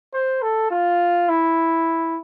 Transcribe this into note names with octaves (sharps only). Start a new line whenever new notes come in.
C5
A4
F4
E4